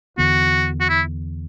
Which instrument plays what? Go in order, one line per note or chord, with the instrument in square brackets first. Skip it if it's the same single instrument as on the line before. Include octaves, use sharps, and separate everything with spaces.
[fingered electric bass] E2 D3 B3 [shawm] F#4
[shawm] F#4
E4